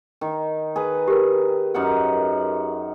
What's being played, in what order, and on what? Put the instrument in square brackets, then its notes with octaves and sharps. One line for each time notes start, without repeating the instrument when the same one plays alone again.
[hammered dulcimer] D#3
G#4 B4
[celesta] G4 A#4
[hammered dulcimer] F#2 D#4 F#5